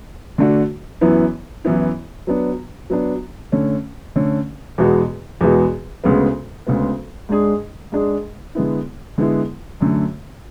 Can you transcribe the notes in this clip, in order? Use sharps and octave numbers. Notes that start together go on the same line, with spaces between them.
D3 A3 D4 F#4
F#2 E3 B3 E4
F#2 E3 B3 E4
F#3 B3 D4
F#3 B3 D4
D3 A3 C#4
D3 A3 C#4
E2 B2 G#3 B3 F#4
E2 B2 G#3 B3 F#4
D2 C#3 G#3 B3
D2 C#3 G#3 B3
G#2 G#3 D4 G#4
G#2 G#3 D4 G#4
D3 G#3 B3 E4
D3 G#3 B3 E4
F#2 D3 A3